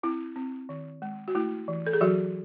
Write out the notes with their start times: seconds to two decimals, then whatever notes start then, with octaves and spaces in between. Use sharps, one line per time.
0.03 C4 E4
0.36 C4
0.69 D#3
1.02 G#3
1.28 F#4
1.35 A3 E4
1.68 E3
1.87 A4
1.93 G#4
2.01 E3 F#3 F#4